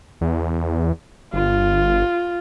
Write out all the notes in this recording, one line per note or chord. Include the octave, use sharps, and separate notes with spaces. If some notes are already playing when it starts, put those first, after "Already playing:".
E2
G1 F4